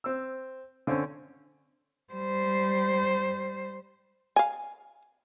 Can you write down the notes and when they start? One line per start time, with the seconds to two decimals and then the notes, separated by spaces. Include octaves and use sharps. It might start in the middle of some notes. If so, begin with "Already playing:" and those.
0.04 C4 E6
0.87 D3 C4 C#4
2.14 G3 C5
4.36 F5 G#5